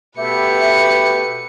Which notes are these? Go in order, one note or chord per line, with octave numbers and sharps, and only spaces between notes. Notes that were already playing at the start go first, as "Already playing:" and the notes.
B2 A3 G4 B4 E5 C#7